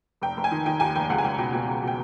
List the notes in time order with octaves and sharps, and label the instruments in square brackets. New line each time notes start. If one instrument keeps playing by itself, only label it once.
[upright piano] F1 G5
F1
G#5
D#3
D#3 G5
D#2 G#5
F1 G5
C#2 F#5
G#5
C#2 G5
B2 G5
B2 G5
C#2
B2 G5